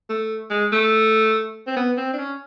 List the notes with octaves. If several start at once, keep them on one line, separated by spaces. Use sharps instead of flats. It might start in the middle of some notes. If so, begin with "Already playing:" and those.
A3
G#3
A3
C4
B3
C4
D4
C#4